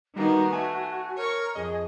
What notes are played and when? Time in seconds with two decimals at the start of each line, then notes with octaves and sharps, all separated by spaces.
0.16 D#3 G3 A#3 B3 D#4 F#4
0.52 A3 G#5
1.17 A#4 C#5 C#6
1.55 F2 G#4 D#5